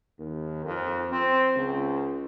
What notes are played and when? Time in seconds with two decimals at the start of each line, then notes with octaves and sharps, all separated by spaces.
0.19 D#2
0.65 F2
1.12 C4
1.56 C#2